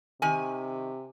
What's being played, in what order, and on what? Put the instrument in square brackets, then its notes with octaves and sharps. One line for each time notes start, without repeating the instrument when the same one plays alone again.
[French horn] C3 [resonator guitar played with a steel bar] D#3 G#5